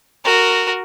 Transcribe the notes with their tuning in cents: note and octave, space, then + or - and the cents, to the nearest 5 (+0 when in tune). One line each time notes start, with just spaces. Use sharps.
F#4 +0 A#4 -10